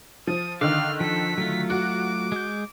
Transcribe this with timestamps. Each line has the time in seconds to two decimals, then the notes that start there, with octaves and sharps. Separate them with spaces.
0.27 F3 D#6
0.61 D3 D#3 F5 D6 F6
1.00 F3 A4 B6
1.38 F#3 A3 F4
1.70 F#4 D6
2.32 G#3 G6